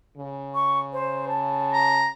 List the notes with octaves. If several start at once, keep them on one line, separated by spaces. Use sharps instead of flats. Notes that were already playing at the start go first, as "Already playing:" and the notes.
C#3
C#6
C5
A5
A#5